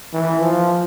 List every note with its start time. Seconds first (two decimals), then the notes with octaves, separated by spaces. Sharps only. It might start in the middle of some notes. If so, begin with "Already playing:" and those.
0.13 E3
0.42 F3